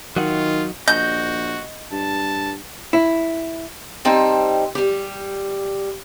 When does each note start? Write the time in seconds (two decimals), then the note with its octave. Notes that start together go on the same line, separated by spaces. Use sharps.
0.17 D#3 F#3 D#4 F4 F#4
0.88 A#1 F#4 D#5 G6
1.92 G2 A5
2.93 E4
4.05 G3 C4 D#4 C5 G5 A5
4.75 G3 G4